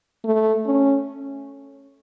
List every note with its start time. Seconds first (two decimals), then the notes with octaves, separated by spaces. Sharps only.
0.24 A3
0.66 C#4